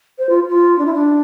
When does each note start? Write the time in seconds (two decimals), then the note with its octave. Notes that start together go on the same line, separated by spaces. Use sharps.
0.18 C5
0.29 F4
0.49 F4
0.78 D4
0.86 E4
0.94 D4